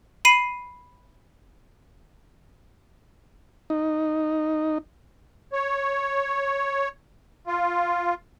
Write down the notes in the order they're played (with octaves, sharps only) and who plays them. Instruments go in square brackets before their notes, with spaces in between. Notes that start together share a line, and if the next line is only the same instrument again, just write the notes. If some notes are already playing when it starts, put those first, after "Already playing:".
[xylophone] B5 C7 D#7
[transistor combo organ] D#4
[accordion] C#5
F4